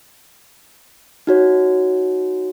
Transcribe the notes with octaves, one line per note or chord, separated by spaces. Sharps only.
D#4 F#4 C#5